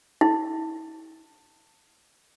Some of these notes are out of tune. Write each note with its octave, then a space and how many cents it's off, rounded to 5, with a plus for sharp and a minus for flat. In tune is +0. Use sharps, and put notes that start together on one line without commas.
E4 -40